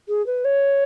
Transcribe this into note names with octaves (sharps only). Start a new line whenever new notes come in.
G#4
B4
C#5